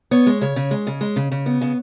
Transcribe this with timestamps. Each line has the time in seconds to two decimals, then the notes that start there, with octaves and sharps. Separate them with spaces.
0.11 B3 C#5
0.27 G#3
0.41 C#3 C#5
0.56 C#3
0.71 G#3
0.87 C#3
1.01 G#3
1.16 C#3
1.31 C#3
1.46 B3
1.61 C#3